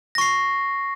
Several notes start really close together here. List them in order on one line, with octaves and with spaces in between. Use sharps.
A#6 C#6 C7